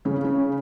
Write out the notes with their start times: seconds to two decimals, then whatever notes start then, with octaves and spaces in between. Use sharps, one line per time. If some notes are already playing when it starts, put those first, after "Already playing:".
0.05 C#3 C#4
0.24 C#4